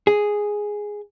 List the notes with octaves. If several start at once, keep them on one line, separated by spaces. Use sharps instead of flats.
G#4